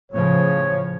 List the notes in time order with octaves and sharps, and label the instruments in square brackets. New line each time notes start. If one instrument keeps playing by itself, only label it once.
[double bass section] A2 C#3 F3 [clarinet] C#5